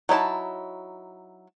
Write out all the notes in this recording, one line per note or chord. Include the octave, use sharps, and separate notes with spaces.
F#3 D#4 E4 A5